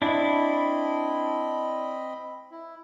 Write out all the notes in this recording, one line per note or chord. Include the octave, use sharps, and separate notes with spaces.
C4 D4 E4 D#5 B5
E4